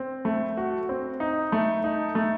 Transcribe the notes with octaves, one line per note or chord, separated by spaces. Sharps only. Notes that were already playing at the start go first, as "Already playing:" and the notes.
Already playing: C4
A3
F#4
C4
D#4
A3
D#4
A3